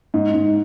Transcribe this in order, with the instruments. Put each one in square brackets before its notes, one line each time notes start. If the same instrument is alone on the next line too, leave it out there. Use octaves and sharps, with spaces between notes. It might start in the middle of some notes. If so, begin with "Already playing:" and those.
[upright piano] G#2
G#2